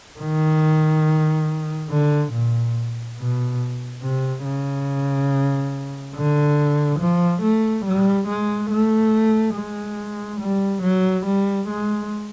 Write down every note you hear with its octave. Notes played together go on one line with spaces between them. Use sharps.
D#3
D3
A#2
B2
C3
C#3
D3
F3
A3
G3
G#3
A3
G#3
G3
F#3
G3
G#3